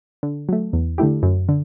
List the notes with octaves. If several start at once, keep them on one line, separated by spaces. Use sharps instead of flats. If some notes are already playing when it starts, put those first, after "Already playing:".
D3
F#3 A3
E2
D3 A3 E4 G4
F#2
D3